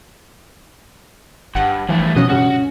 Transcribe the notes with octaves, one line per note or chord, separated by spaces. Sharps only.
G1 G2 F#5
G2 E3 F3 A3
B2 F3 C#4 F#4 D#5
C#2 G2 C#4 F#4